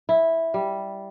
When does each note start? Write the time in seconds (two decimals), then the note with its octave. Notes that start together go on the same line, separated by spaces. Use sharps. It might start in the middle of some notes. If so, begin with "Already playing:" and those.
0.09 E4
0.54 G3